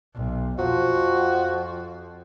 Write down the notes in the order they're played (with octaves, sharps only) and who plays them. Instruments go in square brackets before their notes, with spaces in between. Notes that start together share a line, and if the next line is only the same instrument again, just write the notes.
[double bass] B1
[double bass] F2 [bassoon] F3 [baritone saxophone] F#4